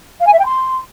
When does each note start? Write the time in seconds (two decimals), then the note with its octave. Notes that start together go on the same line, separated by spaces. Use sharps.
0.20 F5
0.26 G#5
0.32 E5
0.39 G5
0.45 C6